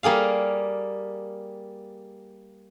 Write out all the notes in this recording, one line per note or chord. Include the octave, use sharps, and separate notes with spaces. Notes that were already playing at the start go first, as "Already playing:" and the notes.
G3 A#3 G#4 F5